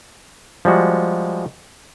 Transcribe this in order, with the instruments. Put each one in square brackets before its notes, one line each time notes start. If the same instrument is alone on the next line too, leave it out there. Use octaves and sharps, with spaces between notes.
[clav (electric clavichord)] F3 G3 G#3 F#4